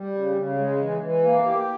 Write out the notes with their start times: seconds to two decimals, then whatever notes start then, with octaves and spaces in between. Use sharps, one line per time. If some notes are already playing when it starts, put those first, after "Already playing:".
Already playing: G3
0.15 C#3
0.36 C#3
0.58 G#3
0.80 E3
1.02 E3
1.23 A#3
1.45 G4